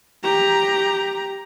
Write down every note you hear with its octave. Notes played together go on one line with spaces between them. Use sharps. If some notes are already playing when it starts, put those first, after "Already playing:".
G4 A#5